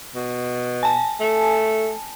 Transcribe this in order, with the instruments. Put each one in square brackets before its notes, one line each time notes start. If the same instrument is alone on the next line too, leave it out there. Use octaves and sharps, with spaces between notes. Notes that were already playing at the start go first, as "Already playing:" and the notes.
[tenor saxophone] B2
[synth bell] G#5 A5
[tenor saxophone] A3